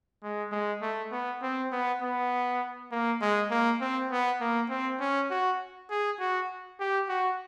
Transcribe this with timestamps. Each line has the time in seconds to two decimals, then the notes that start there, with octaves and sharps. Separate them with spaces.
0.23 G#3
0.52 G#3
0.82 A3
1.12 B3
1.42 C4
1.72 B3
2.02 B3
2.92 A#3
3.21 G#3
3.51 A#3
3.81 C4
4.11 B3
4.41 A#3
4.70 C4
5.00 C#4
5.31 F#4
5.90 G#4
6.20 F#4
6.80 G4
7.09 F#4